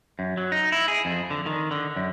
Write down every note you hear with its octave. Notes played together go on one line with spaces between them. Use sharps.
F#2
F#3
D#4
E4
G#4
F2
D3
D#3
D3
F#2